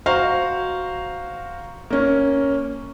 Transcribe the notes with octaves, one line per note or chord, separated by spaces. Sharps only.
F#4 C5 F5 A#5
A#3 C#4